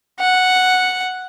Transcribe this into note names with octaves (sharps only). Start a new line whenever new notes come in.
F#5